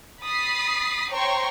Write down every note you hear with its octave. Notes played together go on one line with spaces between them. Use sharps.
B5 D#6 A6 B6 C7
C5 C#5 G5 A#5 C6 C#6